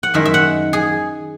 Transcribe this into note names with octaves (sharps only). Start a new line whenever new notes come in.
F#5
F#2 D#3 G#3 E5
E5
F#5
G#4